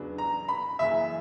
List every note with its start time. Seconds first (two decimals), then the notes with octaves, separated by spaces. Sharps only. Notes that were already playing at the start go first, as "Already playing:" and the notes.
Already playing: E2 C#3 F#3 B3 D4
0.18 A#5
0.48 B5
0.79 F#2 C#3 E3 A#3 E5